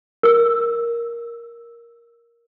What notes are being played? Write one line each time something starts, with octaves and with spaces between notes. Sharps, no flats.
A#4 E6